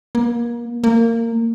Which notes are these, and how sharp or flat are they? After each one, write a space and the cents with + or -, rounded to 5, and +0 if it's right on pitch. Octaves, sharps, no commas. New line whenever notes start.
A#3 +30
A#3 -20